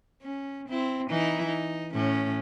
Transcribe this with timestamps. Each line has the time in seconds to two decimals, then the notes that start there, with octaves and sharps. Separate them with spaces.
0.22 C#4
0.69 C4 E4
1.09 E3 D#4 E4
1.46 D#4
1.94 A2 C#4